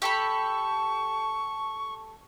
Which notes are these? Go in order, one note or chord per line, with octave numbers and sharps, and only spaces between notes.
G4 A4 B5 C#6